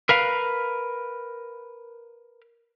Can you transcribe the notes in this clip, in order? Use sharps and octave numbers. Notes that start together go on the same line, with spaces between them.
A#4 B4 F5